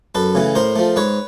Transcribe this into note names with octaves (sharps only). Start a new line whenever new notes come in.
F#2 A4 B4
C#3 E3 A3
A2 A#4 C5
F3 A3
G#2 B4 C#5